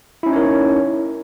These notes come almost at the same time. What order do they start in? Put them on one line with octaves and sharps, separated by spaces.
E4 C#4 D#4 C#5 A#4